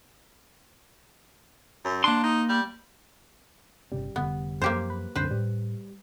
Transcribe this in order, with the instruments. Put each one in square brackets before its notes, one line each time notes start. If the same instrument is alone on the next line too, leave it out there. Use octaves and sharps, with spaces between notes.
[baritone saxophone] F#2
[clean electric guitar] A#3 C6 [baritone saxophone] D4
[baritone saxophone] D#4
G3
[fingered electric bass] G1 C3 C#4 [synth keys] G3
[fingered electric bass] F1 D3 A3 [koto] B3
[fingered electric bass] F#2 F3 [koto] A#3 G4 C5
[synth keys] B4
[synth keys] C2 F#2 D3 [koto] B4 C5
[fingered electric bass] A2 [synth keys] G3